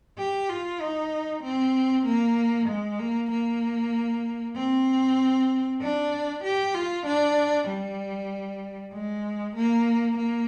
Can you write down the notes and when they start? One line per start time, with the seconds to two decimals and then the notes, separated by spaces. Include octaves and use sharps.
0.18 G4
0.49 F4
0.80 D#4
1.43 C4
2.05 A#3
2.68 G#3
2.99 A#3
3.30 A#3
4.55 C4
5.81 D4
6.43 G4
6.74 F4
7.06 D4
7.68 G3
8.93 G#3
9.55 A#3
10.17 A#3